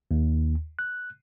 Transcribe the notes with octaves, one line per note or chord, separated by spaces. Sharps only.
D#2
F#6